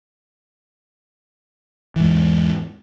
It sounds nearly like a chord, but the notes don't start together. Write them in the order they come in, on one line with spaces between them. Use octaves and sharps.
E3 G#2 E2